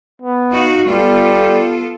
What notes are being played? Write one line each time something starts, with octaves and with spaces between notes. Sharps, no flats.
B3
D#4 F#4 F5
G3 B3 F4 A4